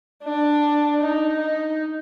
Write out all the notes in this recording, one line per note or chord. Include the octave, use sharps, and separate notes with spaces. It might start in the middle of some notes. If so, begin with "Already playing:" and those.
D4
D#4
D#4